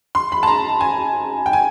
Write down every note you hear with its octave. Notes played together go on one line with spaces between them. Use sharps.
C6
B5
A5
A#5
G#5
G5
G#5